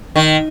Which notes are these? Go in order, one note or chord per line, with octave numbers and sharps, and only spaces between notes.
D#3